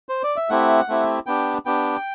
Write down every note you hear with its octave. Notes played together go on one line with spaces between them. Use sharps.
C5
D5
E5
A3 C4 E4 G4 F#5
A3 C4 E4 G4
B3 D4 G4 G5
B3 D4 G4 G5